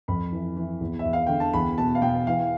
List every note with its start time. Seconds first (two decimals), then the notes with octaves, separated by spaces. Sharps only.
0.08 F2 B5
0.32 E3
0.57 E3
0.81 E2
0.99 E5
1.05 E2
1.13 F5
1.27 D3 G5
1.40 A5
1.53 E2 B5
1.78 B2 A5
1.95 F5
2.02 B2 G5
2.27 E3 F5